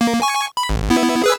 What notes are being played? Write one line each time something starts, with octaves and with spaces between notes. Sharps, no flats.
A#3
G#5 C#6
B5
G#1
B3 E4
G#4 B4 E6